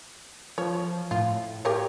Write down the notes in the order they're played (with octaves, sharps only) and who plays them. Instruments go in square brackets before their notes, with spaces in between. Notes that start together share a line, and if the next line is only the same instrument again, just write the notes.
[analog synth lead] F3 [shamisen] C#5
[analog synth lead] A2 [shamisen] F4
[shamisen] G4 A#4 C#5